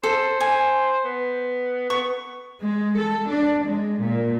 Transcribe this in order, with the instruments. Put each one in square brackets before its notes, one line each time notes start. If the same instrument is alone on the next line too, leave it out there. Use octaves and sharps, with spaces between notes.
[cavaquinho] A4 [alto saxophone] C5
[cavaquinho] G#5
[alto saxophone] B3
[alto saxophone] B3 [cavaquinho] C#6
[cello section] G#3
A4
D4
G#3
A#2